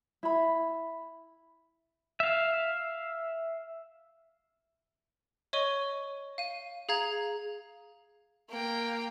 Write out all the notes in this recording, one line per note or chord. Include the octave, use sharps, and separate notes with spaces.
E4 B5
E5 F5
C#5 D#5 C#6 D#7 G7
F5 D#7
G#4 F5 A#5 G#6 F7
A#3 G5